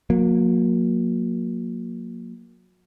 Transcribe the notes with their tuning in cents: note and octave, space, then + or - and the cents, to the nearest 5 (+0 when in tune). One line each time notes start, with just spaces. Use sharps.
F#3 -35 A#3 +0